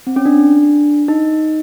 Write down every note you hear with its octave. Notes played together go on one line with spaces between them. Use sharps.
C4
C#4
D4
D#4